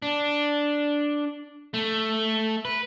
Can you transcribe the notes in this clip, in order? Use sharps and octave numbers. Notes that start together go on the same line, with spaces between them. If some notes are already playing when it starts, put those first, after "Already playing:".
D4
A3
B4